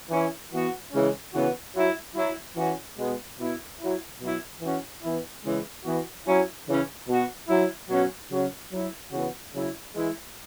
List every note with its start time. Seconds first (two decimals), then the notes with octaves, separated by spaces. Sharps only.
0.10 E3 C#4 E4
0.52 E3 B3 F#4
0.92 C#3 E3 G#3 C#4
1.34 C#3 E3 B3 F#4
1.74 F#3 E4
2.15 F#3 E4
2.57 E3 C#4 F#4
2.97 B2 G#3 B3
3.39 B2 B3 E4
3.79 F#3 E4
4.20 B2 F#3 E4
4.61 E3 C#4 F#4
5.02 E3 B3 E4
5.44 C#3 E3 G#3
5.84 E3 B3 F#4
6.26 F#3 C#4 E4
6.67 C#3 E3 C#4
7.08 B2 B3 F#4
7.49 F#3 E4
7.89 B2 F#3 C#4 F#4
8.31 C#3 F#3 C#4 F#4
8.72 F#3 E4
9.12 C#3 E3 B3 F#4
9.54 C#3 F#3 E4
9.94 E3 G#3 E4